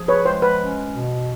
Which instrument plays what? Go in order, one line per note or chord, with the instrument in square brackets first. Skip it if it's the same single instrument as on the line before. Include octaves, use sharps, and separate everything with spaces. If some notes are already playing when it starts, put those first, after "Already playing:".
Already playing: [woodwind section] F3 G#4
[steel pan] B4 C#5
[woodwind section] G#3 [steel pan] C5
[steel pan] B4
[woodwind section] C#4
B2